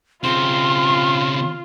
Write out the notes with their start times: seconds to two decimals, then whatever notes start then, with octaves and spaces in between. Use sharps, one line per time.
0.24 C#3 C4 F4 C6